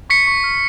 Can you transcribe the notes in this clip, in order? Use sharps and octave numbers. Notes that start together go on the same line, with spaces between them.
C#6 B6 C#7
C#6
F6